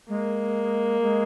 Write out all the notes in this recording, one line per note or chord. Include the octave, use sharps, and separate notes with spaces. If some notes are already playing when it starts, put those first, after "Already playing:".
G#3 A#3
G#3